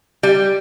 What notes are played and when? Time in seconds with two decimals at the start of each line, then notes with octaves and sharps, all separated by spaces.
0.23 G3